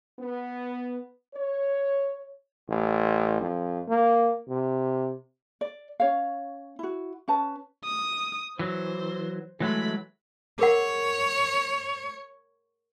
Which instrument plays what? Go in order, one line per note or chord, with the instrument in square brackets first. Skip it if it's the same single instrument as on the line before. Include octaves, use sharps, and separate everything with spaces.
[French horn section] B3
C#5
[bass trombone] A1
F2
A#3
C3
[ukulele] D5
C#4 C#5 F5
E4 F#4
C#4 B4 A5
[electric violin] D#6
[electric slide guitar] E3 F#3 [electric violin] C5
[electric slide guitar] E3 F#3 G#3 [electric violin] A3 B5
[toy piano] G#4 A#4 F#5 [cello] C#5